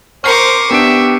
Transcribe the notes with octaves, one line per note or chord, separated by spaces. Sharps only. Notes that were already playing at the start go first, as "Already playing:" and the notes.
A#4 C5 C#6 D6 F6 C7 C#7
B3 D4 G4 E5 D7